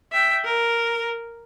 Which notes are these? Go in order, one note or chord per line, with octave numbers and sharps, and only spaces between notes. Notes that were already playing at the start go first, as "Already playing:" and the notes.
E5 G5
A#4